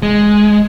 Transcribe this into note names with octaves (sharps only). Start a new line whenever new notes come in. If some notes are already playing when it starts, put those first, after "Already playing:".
G#3